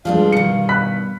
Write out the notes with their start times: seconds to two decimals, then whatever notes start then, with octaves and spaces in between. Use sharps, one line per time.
0.05 C2 G2 F3 G#3 D4 F4 F5
0.32 B2 D#3 C#7
0.69 B5 F#6 B6